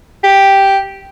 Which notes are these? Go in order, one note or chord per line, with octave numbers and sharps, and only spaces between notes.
G4